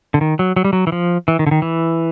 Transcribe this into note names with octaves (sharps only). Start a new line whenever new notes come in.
D3
D#3
F#3
F#3
G3
F#3
E3
F3
E3
D#3
D3
D#3
E3